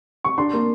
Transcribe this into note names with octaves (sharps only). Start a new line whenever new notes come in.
C#6
D4 C6
A#3